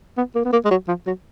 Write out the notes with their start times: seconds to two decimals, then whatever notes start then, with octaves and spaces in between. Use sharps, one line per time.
0.18 B3
0.35 A#3
0.45 B3
0.53 A#3
0.65 G#3
0.71 F#3
0.88 F3
1.07 F#3